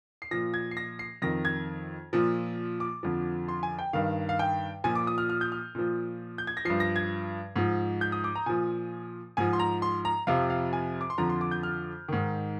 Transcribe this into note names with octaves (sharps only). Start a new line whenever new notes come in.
C7
A#2 F3 A#6
G#6
C7
A#6
C7
F2 D#3 A#6
G#6
A#2 F3
D6
F2 D3 F3
C6
G#5
G5
G2 D#3 F5
F5
G5
A#2 F3 G#5
D6
D#6
F6
F6
G6
F6
A#2 F3
G6
G#6
A#6
G2 F3 C7
A#6
G#6
G#2 F3
G6
D#6
D6
A#5
A#2 F3 G#5
G#2 F3 G#5
C6
A#5
C6
A#5
F2 C3 F3 F5
F5
G#5
D6
C6
F2 D3 F3 A#5
C6
D6
G6
F6
G#2 D#3